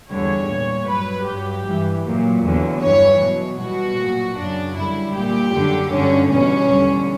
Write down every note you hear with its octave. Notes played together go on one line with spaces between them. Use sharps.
E2 D3 G3 C#5
A#2 G3
G2 F#3 B4
G2 F#3 G4
G2 E3 G3
A#2 F#3
E2 D3 F#3
G2 E3 G3 C#5
B2 F#3
B2 G3 F#4
A#2 F#3
F#2 C#3 F#3 D4
F#2 D3 G3 E4
A#2 G3 G4
F#2 D3 G3
G2 D3 F#3 C#4
E2 B2 G3 C#4
E2 D3 G3